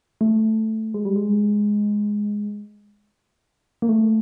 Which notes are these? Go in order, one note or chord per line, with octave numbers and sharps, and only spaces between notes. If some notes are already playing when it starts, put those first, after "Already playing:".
A3
G#3
G3
G#3
A#3
A3